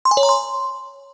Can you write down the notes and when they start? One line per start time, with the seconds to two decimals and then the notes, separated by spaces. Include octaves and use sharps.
0.05 C6
0.11 G#5
0.17 C#5
0.23 A#5
0.29 C6